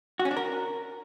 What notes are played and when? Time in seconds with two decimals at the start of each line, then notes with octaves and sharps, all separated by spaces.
0.19 F#4
0.25 C#4
0.31 D4
0.37 A#4